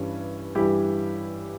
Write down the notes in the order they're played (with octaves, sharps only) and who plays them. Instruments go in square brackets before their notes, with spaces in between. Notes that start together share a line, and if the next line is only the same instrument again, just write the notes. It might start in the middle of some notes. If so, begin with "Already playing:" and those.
Already playing: [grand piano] G2 E3 G3 C#4 E4
G2 E3 G3 E4 G4